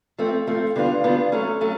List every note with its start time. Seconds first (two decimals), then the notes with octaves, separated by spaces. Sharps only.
0.18 F3 A3 C4
0.47 F3 A3 C4
0.76 D3 G3 B3 D4 F4
1.04 D3 G3 B3 D4 F4
1.32 F#3 A3 C#4
1.61 F#3 A3 C#4